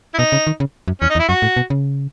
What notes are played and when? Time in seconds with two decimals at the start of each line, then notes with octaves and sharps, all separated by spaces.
0.14 E4
0.18 B2 D#4
0.32 C#3
0.47 D#3
0.60 C#3
0.88 F#2
1.01 E2 C#4
1.10 D#4
1.15 E2
1.19 E4
1.29 F#2 F#4
1.42 A2
1.57 B2
1.70 C#3